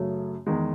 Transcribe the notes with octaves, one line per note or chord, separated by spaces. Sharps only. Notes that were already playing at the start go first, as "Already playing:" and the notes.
Already playing: F#2 C#3 F#3 A3
E2 D#3 G#3